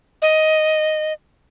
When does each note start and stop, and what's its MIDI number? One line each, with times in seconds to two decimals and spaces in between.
0.22 1.13 75